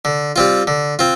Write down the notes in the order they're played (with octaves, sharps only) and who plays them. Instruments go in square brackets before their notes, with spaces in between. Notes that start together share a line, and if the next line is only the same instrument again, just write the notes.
[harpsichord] D3
G3 C4 F4
D3
C4 F4